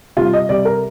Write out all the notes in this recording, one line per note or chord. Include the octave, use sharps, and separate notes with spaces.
C3 G3 F4
D#5
C3 G3 D5
A#4